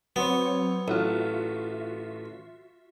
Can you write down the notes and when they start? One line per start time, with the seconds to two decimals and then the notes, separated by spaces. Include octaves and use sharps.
0.16 F#3 B3 C4 C#5
0.88 A1 F4 F#4 E5